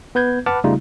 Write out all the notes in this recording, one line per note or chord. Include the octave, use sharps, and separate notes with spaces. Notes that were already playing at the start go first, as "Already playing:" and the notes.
B3 B4 G6 G#6
B4 F#5 A5 B5 D6 F6
C#3 G3 A3 D#4 F4